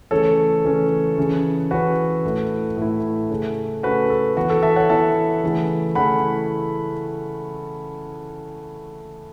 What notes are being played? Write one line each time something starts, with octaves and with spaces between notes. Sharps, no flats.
C#3 E3 A3 C#4 A4 C#5
C#3 E3 A3 C#4
C#3 E3 C#4
C#3 E3 C#4 F#4 B4
A2 A3 E4
A2 A3 E4
C#3 A3 C#4
C#3 A3 C#4 F#4 B4
A4
E3 B3 E4 F#4
A4
E5 A5
C#5 F#5
E3 B3 E4 E5 A5
C#3 E3 A3 C#4 E4
C#3 E3 A3 C#4 E4 F#5 B5